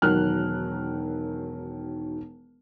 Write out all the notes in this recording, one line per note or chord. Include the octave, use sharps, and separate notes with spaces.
E1 D#3 F#3 A#4 F6 F#6